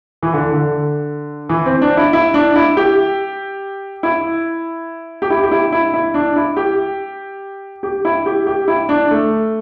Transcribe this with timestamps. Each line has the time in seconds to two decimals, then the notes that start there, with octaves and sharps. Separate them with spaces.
0.23 E3
0.34 D3
0.54 D3
1.49 E3
1.66 C4
1.82 D4
1.97 E4
2.13 E4
2.34 D4
2.56 E4
2.77 G4
4.03 E4
5.22 G4
5.30 E4
5.43 G4
5.51 E4
5.72 E4
5.94 E4
6.14 D4
6.36 E4
6.57 G4
7.83 G4
8.05 E4
8.26 G4
8.47 G4
8.68 E4
8.89 D4
9.11 A3